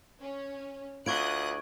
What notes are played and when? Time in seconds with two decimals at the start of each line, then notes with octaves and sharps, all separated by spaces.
0.21 C#4
1.06 D2 F4 B4 C#6 D#6 F#6 G#6 D7